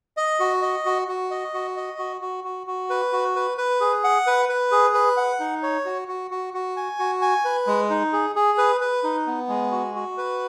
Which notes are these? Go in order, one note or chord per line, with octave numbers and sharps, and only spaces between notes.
D#5
F#4
D#5
F#4
F#4
D#5
F#4
D#5
F#4
F#4
F#4
F#4
B4
F#4
B4
B4
G#4
F#5
B4
B4
G#4
B4
F#5
D#4
C#5
F#4
F#4
F#4
F#4
G#5
F#4
G#5
B4
G#3
D#4
G#4
G#4
B4
B4
D#4
B3
G#3
F#4
F#4
B4